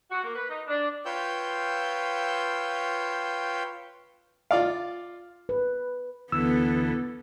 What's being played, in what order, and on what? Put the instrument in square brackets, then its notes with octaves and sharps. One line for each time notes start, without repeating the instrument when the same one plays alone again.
[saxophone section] F#4
A#3
B4
D#4
D4
[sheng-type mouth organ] F4 B4 C#5 G5 E6 G6
[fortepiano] F4 D5 F5
[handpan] B4
[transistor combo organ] D2 E3 [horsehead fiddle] B3 A4 [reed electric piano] E6